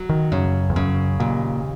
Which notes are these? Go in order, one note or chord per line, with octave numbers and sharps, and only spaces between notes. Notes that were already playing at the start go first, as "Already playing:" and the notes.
Already playing: F#3
D#3
F#2 C#3
E2
F#2 C#3
D#2 A#2